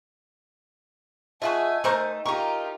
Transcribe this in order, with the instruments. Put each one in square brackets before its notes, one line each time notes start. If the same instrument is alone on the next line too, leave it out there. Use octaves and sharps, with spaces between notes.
[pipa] A3 F4 F#4 [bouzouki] G#4 [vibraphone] D#5 [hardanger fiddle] G#5
[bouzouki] A3 D#4 [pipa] A#4 C5 C#6
[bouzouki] D#4 A#4 [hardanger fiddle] F4 G4 [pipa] C#6